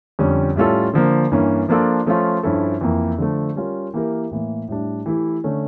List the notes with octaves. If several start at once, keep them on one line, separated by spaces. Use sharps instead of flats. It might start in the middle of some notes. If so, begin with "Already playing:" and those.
F2 D3 G3 C#4
A2 G3 C#4 F4 A4
D3 F3 A#3
G2 E3 A#3 C#4
F3 A#3 D4 F4 A4
F3 A3 C#4 F4
G2 F3 C#4 E4 A4
F2 E3 A#3 E4
D3 F3 A3
G3 C#4 F4 A#4
E3 A#3 E4 G4 A#4
A2 E3 A#3
A2 G3 D4
E3 A3 E4 G4
D3 A3 C#4